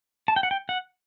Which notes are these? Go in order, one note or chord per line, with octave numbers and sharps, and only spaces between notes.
A5
G5
F#5
G5
F#5